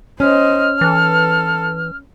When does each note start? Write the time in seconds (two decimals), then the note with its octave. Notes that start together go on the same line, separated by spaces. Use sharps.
0.20 C#4 C5 D#5 F6
0.81 E3 A4